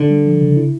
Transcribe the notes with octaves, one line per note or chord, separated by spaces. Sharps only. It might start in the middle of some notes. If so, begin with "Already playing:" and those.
Already playing: D3 D4
G3
F3
C#3
E4